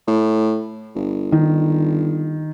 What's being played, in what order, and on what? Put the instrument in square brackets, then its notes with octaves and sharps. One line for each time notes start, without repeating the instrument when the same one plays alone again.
[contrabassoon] A2
G1
[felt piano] D#3